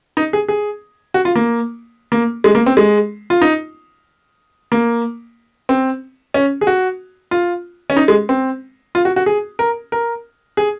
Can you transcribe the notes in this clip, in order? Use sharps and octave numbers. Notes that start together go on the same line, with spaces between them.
D#4
G#4
G#4
F#4
F4
A#3
A#3
G#3
A#3
C4
G#3
F4
D#4
A#3
C4
C#4
G#4
F#4
F4
C#4
D#4
G#3
C4
F4
F#4
F#4
G#4
A#4
A#4
G#4